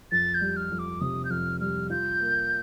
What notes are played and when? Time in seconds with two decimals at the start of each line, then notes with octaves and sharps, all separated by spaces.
0.12 F2 A6
0.34 G6
0.41 G3
0.57 F6
0.71 F2
0.79 D6
1.01 C3 D#6
1.25 G6
1.30 F2 F6
1.60 G3 F6
1.90 F4 G6
2.20 A#3